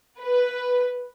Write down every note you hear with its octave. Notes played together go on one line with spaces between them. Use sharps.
B4